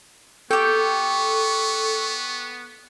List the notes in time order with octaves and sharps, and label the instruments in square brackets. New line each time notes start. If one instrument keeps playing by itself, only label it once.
[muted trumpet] B3 [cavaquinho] G4 G5 [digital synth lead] A4 [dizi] C#6